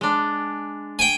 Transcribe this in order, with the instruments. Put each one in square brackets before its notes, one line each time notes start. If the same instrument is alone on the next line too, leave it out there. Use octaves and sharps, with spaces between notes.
[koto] G#3 D4
[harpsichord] G5 G#5